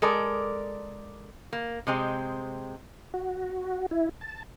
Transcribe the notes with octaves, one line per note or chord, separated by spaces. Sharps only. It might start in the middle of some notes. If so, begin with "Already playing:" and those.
G#3 A4 A#4 D5
A#3
C3 G#3 C4
F#4
E4
A5